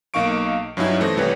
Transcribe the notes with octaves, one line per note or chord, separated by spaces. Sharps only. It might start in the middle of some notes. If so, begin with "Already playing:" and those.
B1 A#3 D#4 F5 C#6 D7
G2 F#3 C#4 D#4 E4
E3 A3 C5 D#6 A#6
C2 E3 G3 B4 C#5